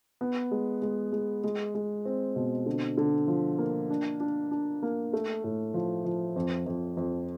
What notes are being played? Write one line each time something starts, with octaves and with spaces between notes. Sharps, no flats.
B3
G#3
G#3
G#3
G#3
G#3
C4
B2
D3
D3
F3
A#3
D4
D4
D4
A#3
A3
A2
F3
F3
F2
F2
F2